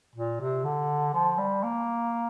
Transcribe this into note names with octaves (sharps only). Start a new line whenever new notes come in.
A#2
C3
D3
F3
G3
A#3